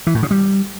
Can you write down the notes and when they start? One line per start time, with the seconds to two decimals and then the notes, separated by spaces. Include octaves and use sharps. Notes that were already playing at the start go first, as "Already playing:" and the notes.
0.07 E3
0.15 A2
0.23 C#3
0.31 G3